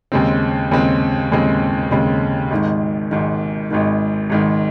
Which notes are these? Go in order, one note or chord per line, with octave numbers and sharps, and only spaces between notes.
D#2 C#3 G#3 C4
D#2 C#3 G#3 C4
D#2 C#3 G#3 C4
D#2 C#3 G#3 C4
G#1 G#2 D#3
G#1 G#2 D#3
G#1 G#2 D#3
G#1 G#2 D#3